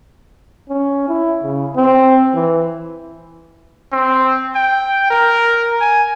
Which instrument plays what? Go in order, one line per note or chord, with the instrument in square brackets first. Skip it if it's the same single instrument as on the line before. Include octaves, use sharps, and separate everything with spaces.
[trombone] C#4
E4
C#3
C4
E3
[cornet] C4
G5
A#4
G#5